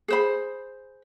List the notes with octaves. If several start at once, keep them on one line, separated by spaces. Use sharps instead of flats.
G#4 C5 B5